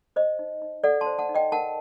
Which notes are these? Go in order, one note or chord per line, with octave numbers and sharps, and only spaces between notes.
C5 D#5
D#4
D#4
A4 D5 F#5
A5 C6
C5
F#5 A5
D#4
D#5 G5
A#4 F#5 A5